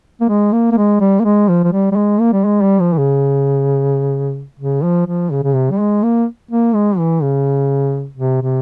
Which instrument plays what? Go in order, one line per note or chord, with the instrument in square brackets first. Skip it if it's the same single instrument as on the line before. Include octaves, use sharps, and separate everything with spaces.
[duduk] A#3
G#3
A#3
A#3
G#3
G3
A#3
G#3
F3
F3
G3
G3
G#3
A#3
G3
G#3
G3
F3
E3
C#3
C#3
F3
F3
C#3
C#3
C3
G3
G#3
A#3
A#3
G#3
E3
C#3
C3
C3